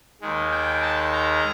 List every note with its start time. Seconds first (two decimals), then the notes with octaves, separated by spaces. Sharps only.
0.22 D#2 D#3 G#3
0.52 G5
0.82 A5
1.13 A#5